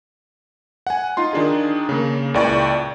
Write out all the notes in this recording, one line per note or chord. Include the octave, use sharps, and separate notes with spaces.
F#5 G#5
D#4 F4 C6
D#3 D4 G#4
C#3 A#3
C#2 A#2 E4 D5 G5 C#6